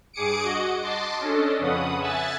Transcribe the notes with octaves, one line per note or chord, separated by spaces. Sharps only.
G2 G#4 D6 D#6 C#7 D7
F#4 D#5 F#5
D#5 A5 C6 D6
C#4 D4 A4 D#5
F2 C#3 B4 F#5 D#6
E5 G#5 E6 F#6 A6